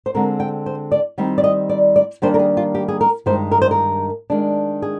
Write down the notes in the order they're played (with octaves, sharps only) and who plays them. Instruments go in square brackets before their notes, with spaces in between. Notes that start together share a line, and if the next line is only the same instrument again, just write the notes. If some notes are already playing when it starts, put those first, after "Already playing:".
[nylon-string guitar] C5
D3 G#3 C4 A#4
G5
C5
D5
D#3 G3 C4 D#4
D5
D#5
D5
D5
D#3 G3 A#3 D4 C5
A#4
G#4
F4
G4
G#4
A#4
G2 D#3 G#3 D#4 C5
A#4
C5
A#4
D#3 G#3 D4
G#4